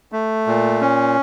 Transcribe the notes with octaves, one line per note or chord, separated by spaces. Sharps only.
A3
A#2
C#4